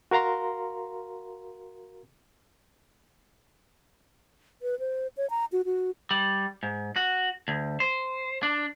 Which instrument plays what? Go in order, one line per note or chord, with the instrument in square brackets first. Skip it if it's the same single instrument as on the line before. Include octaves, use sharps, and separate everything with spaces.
[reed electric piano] F#4 A#4 F5 A#5 C6
[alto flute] B4
C5
C#5
A#5
F#4
F#4
[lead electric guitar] G3
G#2
F#4
D2
C5
D4